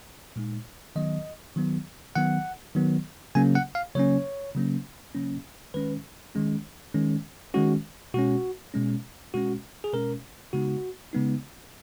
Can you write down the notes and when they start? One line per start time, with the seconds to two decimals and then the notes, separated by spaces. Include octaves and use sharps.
0.36 A#2 G#3 D#4
0.96 D#3 F#3 B3 D#5
1.56 D#3 F#3 B3
2.15 D#3 F#3 B3 F#5
2.75 D#3 F#3 B3
3.35 C#3 F#3 A#3 C#4 G#5
3.55 F#5
3.75 F5
3.95 C#3 F#3 A#3 C#4 C#5
4.55 C#3 F#3 A#3 C#4
5.15 C#3 F#3 A#3 C#4
5.74 D#3 G#3 C#4 B4
6.35 D#3 G#3 C#4
6.94 D#3 G#3 C#4
7.54 D#3 G#3 C#4 F#4
8.14 B2 G#3 C#4 F#4
8.74 B2 G#3 C#4
9.34 B2 G#3 C#4 F#4
9.84 G#4
9.93 B2 G#3 C#4 A#4
10.53 C#3 G#3 B3 D#4 F#4
11.13 C#3 G#3 B3 D#4